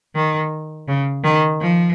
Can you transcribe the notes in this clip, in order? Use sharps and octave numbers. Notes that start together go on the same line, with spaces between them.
D#3
C#3
D#3
F3